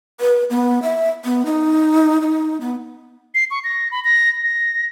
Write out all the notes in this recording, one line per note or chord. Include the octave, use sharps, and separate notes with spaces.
B4
B3
E5
B3
D#4
D#4
B3
C7
C#6
A#6
B5
A#6
A#6